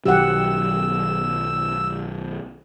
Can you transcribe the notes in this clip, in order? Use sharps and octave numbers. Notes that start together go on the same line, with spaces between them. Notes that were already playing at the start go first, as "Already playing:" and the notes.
B1 D#3 F#3 G4 F#5 E6